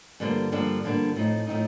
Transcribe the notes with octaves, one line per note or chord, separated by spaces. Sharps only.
G2 D3 F3 A#3 D4
G2 D3 F3 A#3 D4
G2 D3 F3 A#3 D4
A2 F3 C4 D#4
A2 F3 C4 D#4